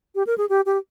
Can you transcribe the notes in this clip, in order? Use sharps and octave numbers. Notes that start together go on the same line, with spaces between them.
G4
A#4
G#4
G4
G4